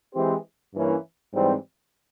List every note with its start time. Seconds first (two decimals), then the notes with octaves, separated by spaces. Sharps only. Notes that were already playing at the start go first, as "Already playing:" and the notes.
0.14 E3 G#3 C4 G4 C5
0.73 G2 E3 A#3 C#4 E4
1.33 G#2 E3 G3 C4